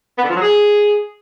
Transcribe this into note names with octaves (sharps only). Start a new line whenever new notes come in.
B3
D3
F3
F#3
G#4